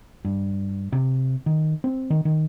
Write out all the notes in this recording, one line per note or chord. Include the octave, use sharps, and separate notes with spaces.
G2
C3
D#3
C4
D#3
D#3